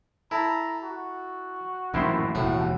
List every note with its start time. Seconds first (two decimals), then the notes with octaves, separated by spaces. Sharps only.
0.31 E4 A4 A#5
0.83 F#4
1.94 A1 F#2 A#2 D#3 E4 C5
2.35 E1 D#2 A2 F#4